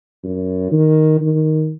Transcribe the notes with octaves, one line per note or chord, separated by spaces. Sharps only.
F#2
D#3
D#3